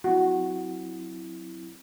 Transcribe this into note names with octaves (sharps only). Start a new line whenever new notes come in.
F#3 C4 E4 F#4